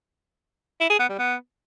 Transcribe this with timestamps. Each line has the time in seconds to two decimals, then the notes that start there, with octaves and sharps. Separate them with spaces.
0.80 E4
0.90 G#4
1.00 B3
1.09 G3
1.19 B3